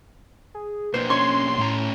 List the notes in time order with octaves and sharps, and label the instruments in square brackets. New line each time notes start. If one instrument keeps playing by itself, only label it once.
[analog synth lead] G#4
[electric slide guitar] B2 A#3 D4 [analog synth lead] B4 [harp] C5
[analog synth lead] C#4 [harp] C#5 [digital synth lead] C6
[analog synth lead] A2 [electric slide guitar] A3 C#4 A#5